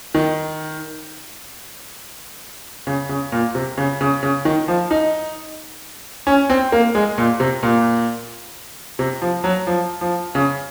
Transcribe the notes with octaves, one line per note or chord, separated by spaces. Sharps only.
D#3
C#3
C#3
A#2
C3
C#3
C#3
C#3
D#3
F3
D#4
C#4
C4
A#3
G#3
A#2
C3
A#2
C3
F3
F#3
F3
F3
C#3